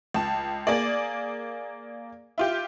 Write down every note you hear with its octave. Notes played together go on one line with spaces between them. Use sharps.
C#2 A5
A#3 G#4 D5
E4 F4 G4